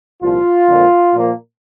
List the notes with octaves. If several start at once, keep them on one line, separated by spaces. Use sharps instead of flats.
C2 A#2 F3 F4
F2 D3 F3 A#3
A#2 F3 A#3